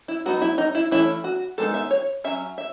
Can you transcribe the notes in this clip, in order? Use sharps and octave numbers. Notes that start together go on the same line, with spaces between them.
E4
F#3 B3 D#4 F#4
E4
D#4
E4
E3 A3 C#4 E4
F#4
D#3 G#3 B3 D#4 A4
E5
C#5
F#3 C#4 E5
E5